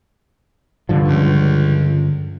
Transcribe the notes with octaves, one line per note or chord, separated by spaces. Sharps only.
G2 D3 F3
C#2